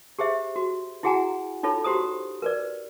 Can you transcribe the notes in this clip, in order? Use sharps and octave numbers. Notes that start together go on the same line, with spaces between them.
G4 G#4 C5 E5
F#4
E4 F#4 G#4 F#5 G#5 A#5
D#4 F4 A4 C#5 B5
F#4 G4 C5 A#5 D#6
A#4 B4 D5